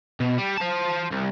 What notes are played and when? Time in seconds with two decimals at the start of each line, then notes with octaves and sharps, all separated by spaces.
0.20 B2
0.38 G3
0.57 C5 A5
1.11 C2